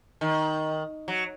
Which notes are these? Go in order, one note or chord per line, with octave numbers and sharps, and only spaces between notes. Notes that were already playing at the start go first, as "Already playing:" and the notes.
D#3
F#3